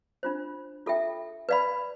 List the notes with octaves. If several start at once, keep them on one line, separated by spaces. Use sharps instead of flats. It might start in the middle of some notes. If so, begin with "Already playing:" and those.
D4 F4 C5
F4 A4 E5 G5
B4 D5 F5 B5